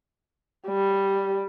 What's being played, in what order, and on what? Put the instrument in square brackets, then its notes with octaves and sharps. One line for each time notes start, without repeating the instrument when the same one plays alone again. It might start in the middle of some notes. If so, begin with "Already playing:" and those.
[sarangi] G3